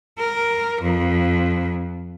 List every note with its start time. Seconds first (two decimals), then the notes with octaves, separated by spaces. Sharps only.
0.19 A#4
0.82 F2